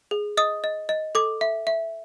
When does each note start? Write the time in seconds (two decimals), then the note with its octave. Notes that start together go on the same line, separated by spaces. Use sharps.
0.11 G#4
0.37 D#5 D#6
0.64 D#5
0.89 D#5
1.15 A4 D6
1.41 E5
1.67 E5